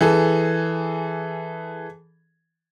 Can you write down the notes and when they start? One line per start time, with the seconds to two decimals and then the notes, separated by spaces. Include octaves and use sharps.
0.01 E3 G#4 A4